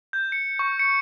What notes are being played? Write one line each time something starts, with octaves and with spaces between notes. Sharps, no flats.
G6
C#7
C#6
C#7